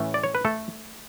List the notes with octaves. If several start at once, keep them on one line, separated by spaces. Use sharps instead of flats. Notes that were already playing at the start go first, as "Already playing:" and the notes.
Already playing: A2 E3 A3 C#4 E4
D5
C#5
B4
A3 A4